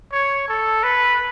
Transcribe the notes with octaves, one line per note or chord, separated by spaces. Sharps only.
C#5
A4
B4